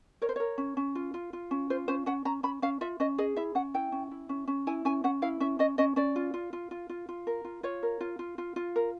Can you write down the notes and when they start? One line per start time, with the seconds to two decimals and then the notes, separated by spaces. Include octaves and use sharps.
0.22 A#4 C#5
0.29 C5
0.36 A#4 C#5
0.58 C#4
0.77 C#4
0.95 F4
1.14 F4
1.33 F4
1.51 C#4
1.70 F4 C5
1.88 C#4 C5
2.06 C#4 F#5
2.25 C#4 A#5
2.43 C#4 B5
2.62 C#4 F5
2.81 F4 E5
3.00 C#4 D#5
3.18 G#4 D#5
3.36 E4 E5
3.55 C#4 F#5
3.74 E4 G5
3.92 C#4
4.11 E4
4.29 C#4
4.48 C#4
4.67 E4 G#5
4.85 C#4 G#5
5.04 C#4 F#5
5.22 E4 F5
5.40 C#4 E5
5.59 C#4 D#5
5.78 C#4 D#5
5.96 C#4 D5
6.16 F4
6.34 F4
6.53 F4
6.71 F4
6.89 F4
7.09 F4
7.27 A#4
7.45 F4
7.63 F4 C#5
7.83 A#4
8.01 F4
8.19 F4
8.38 F4
8.56 F4
8.76 A#4